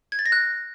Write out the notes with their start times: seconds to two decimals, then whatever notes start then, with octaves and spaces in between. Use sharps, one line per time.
0.12 G#6
0.19 A6
0.26 A#6
0.32 F#6